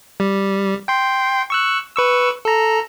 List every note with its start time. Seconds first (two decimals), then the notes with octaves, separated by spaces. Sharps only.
0.20 G3
0.88 G5 C6
1.50 C#6 E6 F#6
1.95 B4 C#6 E6
2.45 A4 A#5